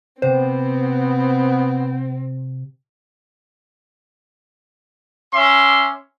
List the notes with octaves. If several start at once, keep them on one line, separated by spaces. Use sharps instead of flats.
C3 B3 C4 C5
C#4 E5 C6 D6